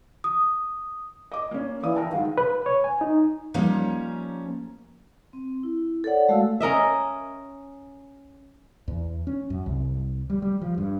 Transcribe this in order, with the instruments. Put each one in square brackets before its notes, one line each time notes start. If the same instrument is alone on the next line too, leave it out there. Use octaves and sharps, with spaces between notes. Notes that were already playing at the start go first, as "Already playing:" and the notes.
[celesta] D#6
[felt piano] D#5 D6
A#3 C#4
[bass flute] E3 [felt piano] D5 F5 D#6
[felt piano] A#4 G5 A5
[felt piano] D#3 F#3 G#3 [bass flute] F5
[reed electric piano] B4
C#5
G#5
D#4
[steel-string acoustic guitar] F3 G3 A#3 C#4 D#4 C#5
[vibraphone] C4
E4
A4 A#4 C#5 D5 F#5
G#3 A3 F#4 F5 E6
[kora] C#4 A#4 D#5 E5
[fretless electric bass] E2
C#4
F#2
C2
G3
G3
F3
G2